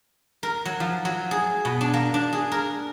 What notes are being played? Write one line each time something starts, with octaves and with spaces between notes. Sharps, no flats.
A#4
F#3
F3
F#3
G#4
B2
D4
A#3
D4
G#4
A#4